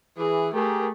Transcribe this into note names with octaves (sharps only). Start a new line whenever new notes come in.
E3 G#4
A3 G4 G#4 A#4